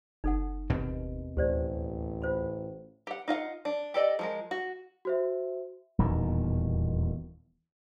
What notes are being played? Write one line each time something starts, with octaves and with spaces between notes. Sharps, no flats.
F#1 D#4 A4 F#5
D#2 B2 C4
A1 D2 G4 C5 D5
F4 C5 B5
G4 F#5
D#4 F4 F5 F#5
D4
G4 A4 D5 D#5
F3 G#3 A#4
F#4
F#4 C5 E5
D#1 E2 B2 D#3